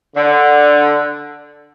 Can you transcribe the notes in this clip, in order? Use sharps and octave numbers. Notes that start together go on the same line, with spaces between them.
D3